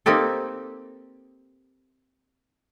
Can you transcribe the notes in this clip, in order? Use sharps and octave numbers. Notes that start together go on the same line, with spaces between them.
A#3 C4 D#4 G4 A4